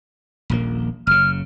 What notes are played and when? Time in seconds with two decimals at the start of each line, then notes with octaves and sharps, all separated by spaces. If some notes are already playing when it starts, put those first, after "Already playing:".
0.50 D#1 A#1 A#3
1.07 F#1 C#3 F6